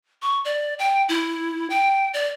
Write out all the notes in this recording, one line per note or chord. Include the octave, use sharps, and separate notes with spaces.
C#6
D5
G5
E4
G5
D5